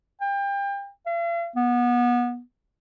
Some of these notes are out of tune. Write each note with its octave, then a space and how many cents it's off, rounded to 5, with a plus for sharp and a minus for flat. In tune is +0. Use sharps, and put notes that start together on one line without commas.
G5 +30
F5 -45
B3 -25